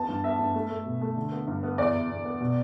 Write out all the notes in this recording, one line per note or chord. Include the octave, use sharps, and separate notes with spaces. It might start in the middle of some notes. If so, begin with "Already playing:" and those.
Already playing: E2 B3 A5
G2
B3 E5
G2
A3
A3
B2
A3
D3
B3
G2
B3
E2 D5
E2
E2
B3
B2